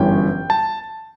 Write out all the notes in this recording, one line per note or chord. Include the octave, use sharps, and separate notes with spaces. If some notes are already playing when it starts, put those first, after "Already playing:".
Already playing: G1 F#2 E3 G3 C#4 G5
A5